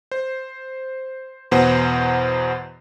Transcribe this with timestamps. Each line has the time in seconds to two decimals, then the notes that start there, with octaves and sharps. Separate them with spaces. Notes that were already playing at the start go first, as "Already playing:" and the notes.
0.12 C5
1.52 E2 B2 B3 C5 F#5